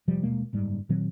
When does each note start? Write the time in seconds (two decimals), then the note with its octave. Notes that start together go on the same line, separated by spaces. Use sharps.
0.08 F1 C3 F3 G3
0.23 D#1 B2 G#3 A#3
0.53 F#1 G#2 G3
0.89 A#2 D#3 F#3 C4